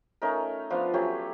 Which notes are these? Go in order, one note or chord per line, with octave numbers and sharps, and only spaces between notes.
A3 C#4 D#4 A#4
F3 B3 D4 F4
F#3 A3 C#4 G4